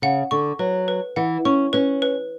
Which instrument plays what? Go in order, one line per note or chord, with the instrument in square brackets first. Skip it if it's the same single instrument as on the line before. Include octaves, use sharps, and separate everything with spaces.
[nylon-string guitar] C#3 [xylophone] F#5
[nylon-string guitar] D3 [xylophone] C#6
[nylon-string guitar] F#3 [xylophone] B4
[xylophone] B4
[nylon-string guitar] E3 [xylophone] F#5
[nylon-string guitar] C#4 [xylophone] C#6
[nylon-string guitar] C#4 [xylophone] B4
[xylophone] B4